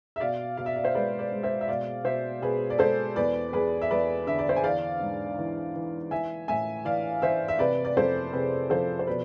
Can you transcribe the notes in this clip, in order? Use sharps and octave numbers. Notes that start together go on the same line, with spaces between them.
E5
B2 D5 F5
B2 F5
E5
D5
C5 E5
G#3 B4 D5
B4 D5
G#3
C5 E5
E5
B2 D5 F5
B2 C5 E5
B2 G#4 B4
D5
G#3 A4 C5
E2 B4 D5
E2 G#4 B4
E5
E2 B4 D5
D3 E5
D5
C5 E5
G#5
E3 D5 F5
G#2
E3
E3
E3 E5 G#5
A2 E5 G#5
E3 D5 F5
E3 C5 E5
E5
C3 B4 D5
D5
F2 A4 C5
C3 G#4 B4
F3 A4 C5
C5
B2 B4 D5